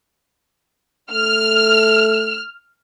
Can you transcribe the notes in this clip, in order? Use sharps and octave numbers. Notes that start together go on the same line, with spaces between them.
A3 F6